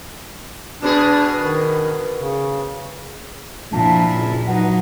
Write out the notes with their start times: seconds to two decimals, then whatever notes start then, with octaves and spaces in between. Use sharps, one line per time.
0.82 B2 B3 D4 G#4
1.38 D#3
2.17 C#3
3.73 A#2 F3 D4 E4 A5
4.11 F#1
4.47 F#3 D#4 B4 F#5